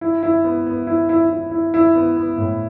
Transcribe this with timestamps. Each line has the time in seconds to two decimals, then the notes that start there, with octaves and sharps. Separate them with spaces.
0.01 E4
0.23 E4
0.44 B3
0.67 B3
0.87 E4
1.09 E4
1.30 E4
1.51 E4
1.74 E4
1.95 B3
2.17 B3
2.38 A2